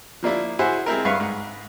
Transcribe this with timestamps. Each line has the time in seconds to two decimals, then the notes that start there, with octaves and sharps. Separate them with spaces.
0.23 F3 A#3 D4 E4
0.59 E4 F#4 G#4 C5
0.86 G#3 C4 E4 A#4
1.05 G2 B4 E5 F5 C#6
1.20 G#2